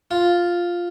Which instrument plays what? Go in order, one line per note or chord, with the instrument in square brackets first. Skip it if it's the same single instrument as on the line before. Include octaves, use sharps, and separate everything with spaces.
[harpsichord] F4